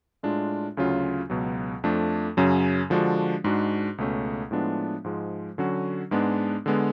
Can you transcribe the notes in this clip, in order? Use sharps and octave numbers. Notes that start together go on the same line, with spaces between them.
A2 G#3 D4 F4
D2 C#3 F#3 C#4 F4
C#2 B2 F#3
F2 F3 A3 D4
F#2 C#3 F#3 C#4
D3 F3 G#3 D4 F#4
G#2 G#3 D4 F#4
C#2 B2 A3 C#4
A2 F3 G#3 B3 D4
G#2 F3 G#3
D3 F#3 C#4 F#4
G#2 G#3 B3 D4
D3 G#3 B3